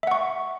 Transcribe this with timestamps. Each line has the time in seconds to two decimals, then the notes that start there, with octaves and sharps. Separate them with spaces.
0.03 E5
0.07 F#5
0.11 C#6